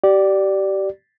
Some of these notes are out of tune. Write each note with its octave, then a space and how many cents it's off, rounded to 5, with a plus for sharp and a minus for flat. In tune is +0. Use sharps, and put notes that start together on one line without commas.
G4 -30 D5 +0